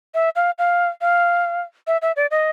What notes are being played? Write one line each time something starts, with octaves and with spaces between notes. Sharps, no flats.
E5
F5
F5
F5
E5
E5
D5
D#5